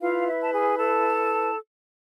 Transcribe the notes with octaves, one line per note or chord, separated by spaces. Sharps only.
E4 F4 B4 F5
E5
A5
G#4 G#5
A4 A5